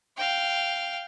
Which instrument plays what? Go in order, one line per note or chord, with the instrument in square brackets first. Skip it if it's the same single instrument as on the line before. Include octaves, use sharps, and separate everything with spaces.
[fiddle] F5 G5